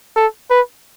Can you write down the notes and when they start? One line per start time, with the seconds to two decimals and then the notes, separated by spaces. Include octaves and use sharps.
0.16 A4
0.50 B4